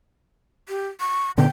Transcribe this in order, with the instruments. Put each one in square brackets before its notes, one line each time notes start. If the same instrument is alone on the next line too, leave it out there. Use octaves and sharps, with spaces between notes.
[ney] G4
C#6
[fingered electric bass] A#2 D3 B3 [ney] G5